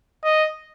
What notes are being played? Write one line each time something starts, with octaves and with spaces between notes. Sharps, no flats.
D#5